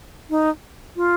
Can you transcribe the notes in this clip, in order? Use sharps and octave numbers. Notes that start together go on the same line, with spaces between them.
D#4
F4